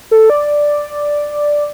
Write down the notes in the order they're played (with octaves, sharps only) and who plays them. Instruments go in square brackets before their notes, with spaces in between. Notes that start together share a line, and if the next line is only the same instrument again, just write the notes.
[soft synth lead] A4
D5